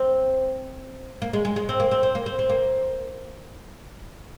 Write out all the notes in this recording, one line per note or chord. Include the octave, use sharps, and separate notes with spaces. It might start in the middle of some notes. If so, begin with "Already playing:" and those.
Already playing: C4
A#3
G#3
G#3
G#3
C4
A#3
C4
C4
A#3
C4
C4
A#3